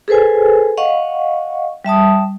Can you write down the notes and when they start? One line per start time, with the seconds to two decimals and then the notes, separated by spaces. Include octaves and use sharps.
0.08 G#4 A4 B4 C5 G#5
0.77 D#5 F5 F#5 C#6
1.85 G3 E5 A5 D#6